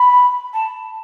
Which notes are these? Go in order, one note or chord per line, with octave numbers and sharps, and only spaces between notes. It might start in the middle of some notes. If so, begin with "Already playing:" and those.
Already playing: B5
A5